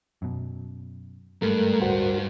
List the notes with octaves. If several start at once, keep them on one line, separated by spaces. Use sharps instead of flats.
F#2 B2
G#1 G2 G#3 A3 A#4
D1 F#4 A#4 C5